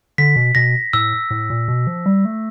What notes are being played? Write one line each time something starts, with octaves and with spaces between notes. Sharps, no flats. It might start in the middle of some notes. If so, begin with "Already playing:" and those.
D3 B6
B2
B2 A#6
A2 E6
A2
A#2
B2
F3
G3
A3